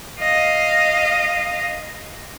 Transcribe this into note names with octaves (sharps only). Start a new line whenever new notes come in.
D#5 F5